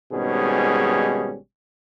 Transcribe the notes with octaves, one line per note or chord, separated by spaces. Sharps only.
G#1 G#2 B2 G3 C#4 G#4